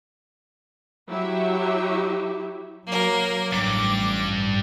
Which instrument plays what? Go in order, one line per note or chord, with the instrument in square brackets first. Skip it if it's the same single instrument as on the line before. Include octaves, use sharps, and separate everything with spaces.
[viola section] F#3 E4 G4 E5
[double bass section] F#3 [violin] A#3 A#4
[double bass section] A1 [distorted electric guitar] G2 [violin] D6